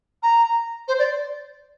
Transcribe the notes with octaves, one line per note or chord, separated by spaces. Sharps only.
A#5
C5
D5